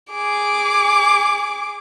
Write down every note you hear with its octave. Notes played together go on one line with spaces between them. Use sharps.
G#4 D6